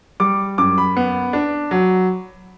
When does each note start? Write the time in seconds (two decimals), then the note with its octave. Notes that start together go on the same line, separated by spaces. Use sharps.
0.20 G3 D6
0.58 F#2 D6
0.78 B5
0.97 B3
1.33 D4
1.71 F#3